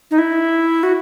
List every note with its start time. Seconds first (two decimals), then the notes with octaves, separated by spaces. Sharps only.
0.11 D#4
0.18 E4
0.83 F#4